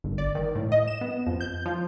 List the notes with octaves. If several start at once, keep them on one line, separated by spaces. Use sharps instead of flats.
G1
D5
D#3
A2
D#5
E7
B3
F2
G6
F3